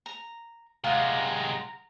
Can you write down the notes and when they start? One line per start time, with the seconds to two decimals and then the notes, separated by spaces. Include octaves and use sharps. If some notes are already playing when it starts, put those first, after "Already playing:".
0.06 A#5
0.84 C3 G#3 F4 F#5 A#5